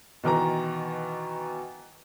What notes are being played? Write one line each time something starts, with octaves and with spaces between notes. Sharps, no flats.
B2 D#3 E3 A#5